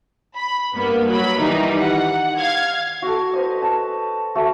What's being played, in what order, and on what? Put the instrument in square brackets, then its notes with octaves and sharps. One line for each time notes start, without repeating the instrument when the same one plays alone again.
[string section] B5
G2 A#3 B3
F#3 B5
D#3 E3 G3 D#4
F#5
F5 G#6
[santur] F#4 A4
B4 C5 D#5
A5
A3 F#4 A5